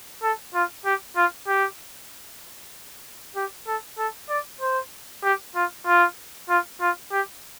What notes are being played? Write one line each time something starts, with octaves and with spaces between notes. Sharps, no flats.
A4
F4
G4
F4
G4
G4
A4
A4
D5
C5
G4
F4
F4
F4
F4
G4